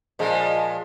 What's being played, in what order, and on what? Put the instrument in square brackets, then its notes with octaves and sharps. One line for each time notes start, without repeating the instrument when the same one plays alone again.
[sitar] A#2 F3 G#3